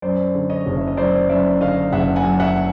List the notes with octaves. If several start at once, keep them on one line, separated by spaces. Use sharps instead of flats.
F#2 C5 D5
D3
C#5 D#5
F#1
E5
D#5
F#3 C5 D5
F#2 D5 E5
D3 D#5 F5
F#1 E5 F#5
F#5 G#5
F#3
E5 F#5